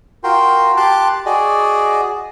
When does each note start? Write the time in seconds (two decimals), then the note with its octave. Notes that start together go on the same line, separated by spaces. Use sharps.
0.24 F4 F#4 A#4 G5 C6
0.77 G4 A5 C6 D6 F#6
1.26 F#4 G#4 D5 D#5